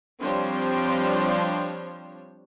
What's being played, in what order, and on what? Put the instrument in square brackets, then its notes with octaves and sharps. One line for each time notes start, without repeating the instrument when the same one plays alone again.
[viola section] F3 G3 C4 D4 C5 C#5